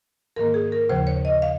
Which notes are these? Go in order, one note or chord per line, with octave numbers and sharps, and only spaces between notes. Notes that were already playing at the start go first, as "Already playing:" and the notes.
G#2 D#3 A#3 A#4
G#4
A#4
D#2 C#3 F3 C5
C#5
D#5
F5